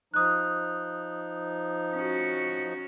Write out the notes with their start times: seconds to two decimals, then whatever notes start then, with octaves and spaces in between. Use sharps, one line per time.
0.14 F3 D#4 D#6 F#6
1.95 C#4 F#4